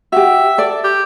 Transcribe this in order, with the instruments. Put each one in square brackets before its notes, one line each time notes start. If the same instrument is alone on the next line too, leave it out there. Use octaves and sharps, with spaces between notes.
[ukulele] F#4 G4 [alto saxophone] E5
[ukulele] A4 D5
[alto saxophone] G4